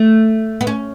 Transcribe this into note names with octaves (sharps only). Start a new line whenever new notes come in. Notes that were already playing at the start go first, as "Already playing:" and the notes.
Already playing: A3
B3
C#4